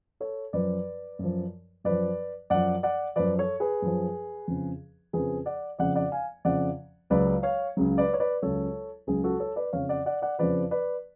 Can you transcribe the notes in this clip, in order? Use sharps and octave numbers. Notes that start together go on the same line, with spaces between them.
A4 C#5
F#2 F3 B4 D5
F#2 F3
F#2 F3 B4 D5
F#2 F3 D5 F#5
D5 F#5
F#2 F3 B4 D5
A4 C#5
G#4 B4
F#2 F3
F2 C#3 F3
F2 C#3 F3 G#4 B4
D5 F#5
F2 C#3 F3 D5 F#5
D5 F#5
F5 G#5
F2 C#3 F3 D5 F#5
C#2 C#3 F#3 B4 D5
C#5 F5
C#2 C#3 F#3
B4 D5
C#5
B4 D5
C#2 C#3 F#3 A4 C#5
C#2 C#3 F#3 G#4
F#4 A4
A4 C#5
B4 D5
F2 C#3 F3 C#5 F5
D5 F#5
D5 F#5
D5 F#5
F2 C#3 F3 B4 D5
B4 D5